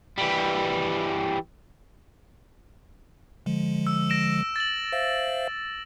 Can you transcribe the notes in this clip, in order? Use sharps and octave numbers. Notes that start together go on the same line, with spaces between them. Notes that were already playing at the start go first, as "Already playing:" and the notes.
E3 G3
D3 F3 G#3
E6
A#6 D7 E7
A6 F#7
C5 E5 F5